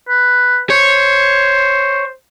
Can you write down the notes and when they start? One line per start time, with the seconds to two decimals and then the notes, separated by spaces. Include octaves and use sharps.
0.08 B4
0.70 C5 C#5